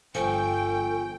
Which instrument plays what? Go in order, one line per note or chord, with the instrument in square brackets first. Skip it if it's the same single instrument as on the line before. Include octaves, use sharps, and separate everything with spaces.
[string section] G1 G5 [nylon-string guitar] F3 [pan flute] A4 [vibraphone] G#5 C#6